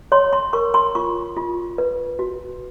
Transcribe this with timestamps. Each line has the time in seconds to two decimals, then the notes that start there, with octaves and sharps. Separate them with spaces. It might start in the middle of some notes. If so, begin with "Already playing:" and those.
0.12 C#5 C6
0.33 C6
0.53 A#4 C#6
0.74 C6
0.95 F4 C#6
1.36 F4
1.78 B4
2.19 F#4